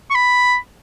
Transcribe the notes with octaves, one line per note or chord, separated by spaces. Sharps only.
C#6
B5